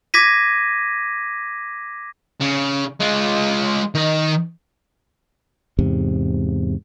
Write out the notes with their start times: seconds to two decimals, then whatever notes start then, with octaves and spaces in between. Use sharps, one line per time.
0.14 D6 G#6 A#6 B6 D#7
2.41 C#3
3.00 G#3 F4
3.95 D#3 D#5
5.79 E2 G#2 C3